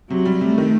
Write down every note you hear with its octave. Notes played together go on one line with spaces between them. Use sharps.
C3 F#3
G3
C3 A3
D#3